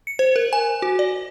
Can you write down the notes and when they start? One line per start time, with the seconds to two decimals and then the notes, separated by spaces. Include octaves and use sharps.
0.07 C#7
0.19 C5
0.36 A#4
0.53 G#5
0.82 F#4
0.99 D5